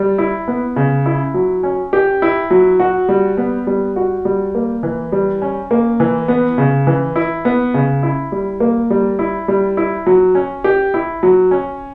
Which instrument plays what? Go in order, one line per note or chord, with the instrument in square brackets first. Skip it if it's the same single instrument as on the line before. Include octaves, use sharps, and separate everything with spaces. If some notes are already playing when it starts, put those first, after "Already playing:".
Already playing: [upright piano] G3
E4
B3
C#3
E4
F#3
C#4
G4
E4
F#3
F#4
G3
B3
G3
F#4
G3
A#3
E3
G3
C#4
A#3
E3
B3
C#3
E3
E4
B3
C#3
E4
G3
A#3
G3
E4
G3
E4
F#3
C#4
G4
E4
F#3
C#4